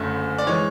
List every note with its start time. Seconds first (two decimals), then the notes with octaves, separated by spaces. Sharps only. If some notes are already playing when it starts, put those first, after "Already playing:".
Already playing: F#1 F#2 D3 A3
0.38 D5
0.47 E3 G#3 C#5